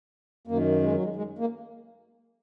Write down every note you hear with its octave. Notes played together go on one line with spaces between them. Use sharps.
F#2 D#3 A#3
G#3
F#3
G#3
G#3
A#3